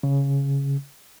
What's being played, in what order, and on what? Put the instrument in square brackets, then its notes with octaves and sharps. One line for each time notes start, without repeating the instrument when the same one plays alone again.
[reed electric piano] C#3